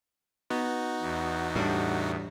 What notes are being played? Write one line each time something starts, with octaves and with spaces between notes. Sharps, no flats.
B3 D#4 F#4
E2
A2 G3 D4